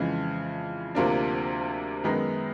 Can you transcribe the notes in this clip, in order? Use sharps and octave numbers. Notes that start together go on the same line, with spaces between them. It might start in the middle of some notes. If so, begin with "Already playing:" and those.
Already playing: F2 C#3 E3 G#3
D2 C3 F3 A#3 D4
F#2 D#3 G#3 B3 D#4